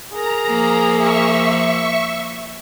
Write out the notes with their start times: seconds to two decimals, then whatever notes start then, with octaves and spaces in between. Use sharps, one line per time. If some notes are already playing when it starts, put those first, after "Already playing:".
0.13 G#4 A#4 A#5
0.47 F3 A#3
0.96 E5 C#6